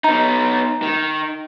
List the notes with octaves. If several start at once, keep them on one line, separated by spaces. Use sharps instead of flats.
B3 D#4 A#5
D#3